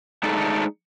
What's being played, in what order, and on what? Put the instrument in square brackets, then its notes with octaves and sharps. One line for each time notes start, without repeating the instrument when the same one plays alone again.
[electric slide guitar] G#3 A3 D4 D#4 G#4 A4